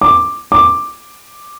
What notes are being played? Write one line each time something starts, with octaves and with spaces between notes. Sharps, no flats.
D6
D6